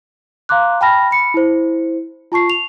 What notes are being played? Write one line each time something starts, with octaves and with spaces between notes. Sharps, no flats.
F5 A#5 C6 D6 F#6
G5 A5 B5 F6 A#6
B5 C#7
E4 C5
F4 A5 C#6 C7
F7